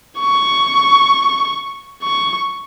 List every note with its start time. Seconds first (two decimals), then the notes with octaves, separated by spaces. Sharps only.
0.20 C#6
2.03 C#6